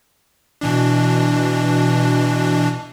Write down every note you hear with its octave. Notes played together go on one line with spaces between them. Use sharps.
B2 E3 D4